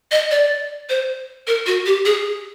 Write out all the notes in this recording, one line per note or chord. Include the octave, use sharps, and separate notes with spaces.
D#5
D5
C5
A#4
F#4
G4
G#4